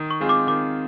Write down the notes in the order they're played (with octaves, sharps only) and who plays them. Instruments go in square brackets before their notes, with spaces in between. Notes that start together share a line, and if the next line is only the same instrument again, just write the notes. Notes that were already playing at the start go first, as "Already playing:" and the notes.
Already playing: [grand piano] D#3
[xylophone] C#6
[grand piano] G#3 C4 F4 G#4
[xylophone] D6
[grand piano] D#3 [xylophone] D6